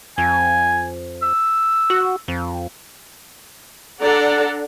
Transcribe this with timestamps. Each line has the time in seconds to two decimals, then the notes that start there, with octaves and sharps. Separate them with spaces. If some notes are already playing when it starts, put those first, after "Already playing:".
0.18 F2 G#5
1.23 E6
1.90 F#4
2.28 F2
4.00 D4 A4 D5 F#5 A#5